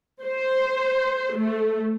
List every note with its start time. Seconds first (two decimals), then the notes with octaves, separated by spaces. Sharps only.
0.24 C5
1.35 A3